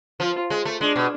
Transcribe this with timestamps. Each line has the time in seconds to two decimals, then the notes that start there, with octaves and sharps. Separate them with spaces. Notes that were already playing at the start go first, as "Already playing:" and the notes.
0.20 F3 F4
0.50 G#3
0.65 A3
0.80 G#3 D4
0.96 B2